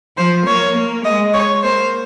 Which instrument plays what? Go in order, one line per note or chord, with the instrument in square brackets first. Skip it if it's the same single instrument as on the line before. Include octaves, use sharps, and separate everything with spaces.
[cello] F3 [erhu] C5
[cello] A#3 [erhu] C#5
[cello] A#3
[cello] G#3 [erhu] D#5
[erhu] C#5
[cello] A#3 [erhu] C5